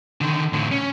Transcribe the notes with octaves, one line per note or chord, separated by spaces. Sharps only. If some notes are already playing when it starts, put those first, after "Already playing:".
D3 D#3
A2 D3
C#4